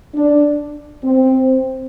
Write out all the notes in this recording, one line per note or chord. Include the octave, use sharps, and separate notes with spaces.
D4
C4